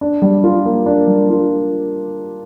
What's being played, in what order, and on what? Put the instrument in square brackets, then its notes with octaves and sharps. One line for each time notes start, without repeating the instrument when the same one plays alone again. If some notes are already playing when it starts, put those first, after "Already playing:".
[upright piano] D4
G3
F4
A#3
D4
G3
F4